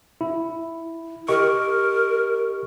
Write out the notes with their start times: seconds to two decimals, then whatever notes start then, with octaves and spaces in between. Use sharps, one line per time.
0.21 E4
1.28 G4 A#4 D#5 C#6